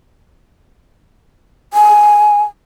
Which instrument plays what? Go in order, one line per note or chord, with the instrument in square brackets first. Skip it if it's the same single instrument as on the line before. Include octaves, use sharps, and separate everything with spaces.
[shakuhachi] G#5